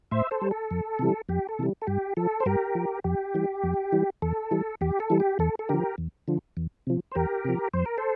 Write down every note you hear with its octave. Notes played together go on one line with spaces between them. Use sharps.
A2 C5 E5
A4 C5
G3
A4
F2
C3 E3 G3
F2 G4
A4
C3 E3 G3
A4
G2 G4
F3 A4
C5
G2 G4 A#4
F3
F2 G4
E3 G3
F2
E3 G3
E2 A4
E3 G3
E2 G4
A4
E3 G3
G4
E2 A4
A4
D3 F3 G4 A#4
E2
D3 F3
E2
C3 F3
C5
E2 G4 A#4
C3 F3
F2 C5
A#4
A4 C5